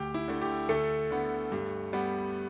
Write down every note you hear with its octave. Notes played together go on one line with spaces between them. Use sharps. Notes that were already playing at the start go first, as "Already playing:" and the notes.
Already playing: D2 G4 G5
E4
D3 A3
G4
D2 A3 A4
D3 B3
G2
G3 B3